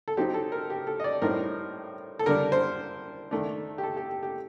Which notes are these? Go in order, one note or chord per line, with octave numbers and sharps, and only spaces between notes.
A4
F#3 C4 D#4 G4
A4
A#4
G4
A4
D#5
D5
A2 G3 C4 D#4 A#4
A4
D3 G3 D4 A#4
C5
D#3 A3 D4
G4
A4
G4
G4
G4